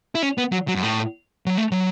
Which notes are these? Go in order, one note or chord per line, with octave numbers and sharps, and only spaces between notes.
E4
C#4
B3
F#3
F#3
F#2
A2
F#3
A3
F#3